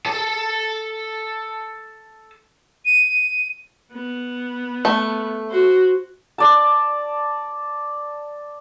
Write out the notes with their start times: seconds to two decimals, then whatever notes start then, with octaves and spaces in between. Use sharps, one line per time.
0.06 A4 A5
2.85 D#7
3.93 B3
4.85 A3
5.50 F#4 C5
6.38 D5 A5